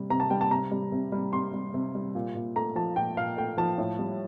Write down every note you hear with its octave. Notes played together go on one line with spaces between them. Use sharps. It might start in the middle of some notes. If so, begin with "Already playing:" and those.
Already playing: C3 G3
C3 A#5
A5
G3 G5
A5
C3 A#5
G3
C3
G3
C3 C6
G3
C3
G3
A#2
A#2
A3 A#5
F3 A5
A#2 G5
A#2 F5
A3 G5
F3 A5
A2
G3